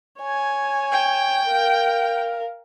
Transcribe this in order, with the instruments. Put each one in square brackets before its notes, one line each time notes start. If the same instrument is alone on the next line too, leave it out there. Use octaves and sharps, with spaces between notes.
[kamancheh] C#5 G#5
[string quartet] G5
[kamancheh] A#4 F5